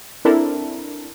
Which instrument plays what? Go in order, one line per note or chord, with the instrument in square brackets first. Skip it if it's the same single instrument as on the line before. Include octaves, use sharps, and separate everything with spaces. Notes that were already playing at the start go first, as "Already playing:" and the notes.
[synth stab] C4 D4 E4 A4 A#4